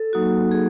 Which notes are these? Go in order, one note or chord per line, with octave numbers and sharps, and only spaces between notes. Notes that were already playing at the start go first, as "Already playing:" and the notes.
Already playing: A4
F#3 A#3 D#4 F#4
G#4